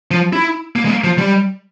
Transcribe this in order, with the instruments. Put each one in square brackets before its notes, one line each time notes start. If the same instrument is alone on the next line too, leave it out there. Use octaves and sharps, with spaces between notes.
[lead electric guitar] F3
E4
A#3
G#3
A#3
F3
G3